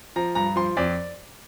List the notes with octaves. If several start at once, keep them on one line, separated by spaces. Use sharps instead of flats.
F3 A#5
G2 A#5
F3 C6
F2 D5